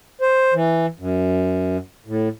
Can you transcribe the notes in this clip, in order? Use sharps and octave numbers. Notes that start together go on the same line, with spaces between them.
C5
E3
F#2
A2